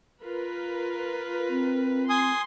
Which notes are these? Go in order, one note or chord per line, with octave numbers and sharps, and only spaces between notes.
F4 A#4 B4
C4
G#5 C6 D#6